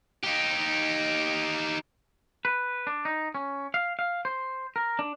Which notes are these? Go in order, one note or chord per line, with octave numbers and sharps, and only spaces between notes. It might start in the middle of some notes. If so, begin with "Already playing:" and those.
D#4 G4
B4
D4
D#4
C#4
F5
F5
C5
A#4
D4